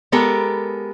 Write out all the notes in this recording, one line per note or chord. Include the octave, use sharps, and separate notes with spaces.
G#3 B3 G4 A4 A#4